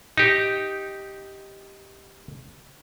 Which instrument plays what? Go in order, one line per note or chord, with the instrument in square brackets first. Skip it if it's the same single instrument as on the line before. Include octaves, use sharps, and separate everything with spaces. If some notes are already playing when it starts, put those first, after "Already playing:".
[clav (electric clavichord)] D#4 G4